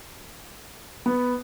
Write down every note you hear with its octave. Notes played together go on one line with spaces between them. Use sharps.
B3